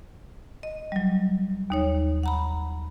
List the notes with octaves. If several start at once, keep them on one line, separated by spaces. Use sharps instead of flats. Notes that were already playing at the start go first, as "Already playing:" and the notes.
D#5
F#3 G3
D#2 D#4 C#5
F#5 A#5 B5